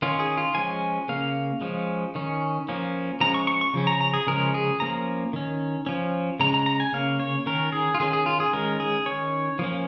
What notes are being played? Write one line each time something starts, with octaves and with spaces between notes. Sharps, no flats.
D#3 C#4 F4
G#4
F4
F3 G#3 C#4 G#5
C#3 A#3 C#4 F5
F3 G#3 C#4
D#3 C#4
F3 A#3 C#4
F3 G#3 C#4 A#5
C#6
C#6
C#6
C#3 F3 C#4
A#5
A#5
G#4
C#3 F3 G#3 C#4 A#4
G#4
F3 A#3 C#4 A#5
D#3 C#4
F3 C#4
C#3 G#3 C#4 A#5
A#5
A#5
G#5
C#3 A#3 C#4 F5
C#5
D#3 C#4 A#4
G#4
F4
D#3 C#4 G#4
G#4
F4
G#4
D#3 G#3 C#4 A#4
G#4
D#3 C#4 C#5
F3 A#3 C#4